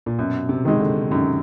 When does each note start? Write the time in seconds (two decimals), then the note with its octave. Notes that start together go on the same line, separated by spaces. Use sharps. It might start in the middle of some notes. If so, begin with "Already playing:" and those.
0.06 A#2
0.18 F#2 B2
0.49 C3
0.65 D#3 G#3
0.80 D3
1.11 F#2 D#3